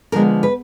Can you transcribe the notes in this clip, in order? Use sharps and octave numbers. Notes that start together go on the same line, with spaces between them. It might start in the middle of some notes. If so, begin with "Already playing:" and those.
D3 F3 G#3 B3 A#4
B4